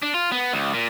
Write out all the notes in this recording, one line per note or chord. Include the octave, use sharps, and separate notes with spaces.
D4
F4
B3
C#2
A#2